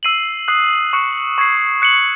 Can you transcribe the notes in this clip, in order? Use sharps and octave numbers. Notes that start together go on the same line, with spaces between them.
E6 C7 D#7 F#7
D#6 F#6 C7
C#6 F#6 C#7
C#6 G#6 C7
F#6 C#7 F#7